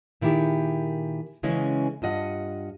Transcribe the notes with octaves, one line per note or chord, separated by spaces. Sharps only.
A#2 D#3 E4 F4 G4 G#4
C#3 E3 G#3 C#4 G#4
G2 F4 D#5 F#5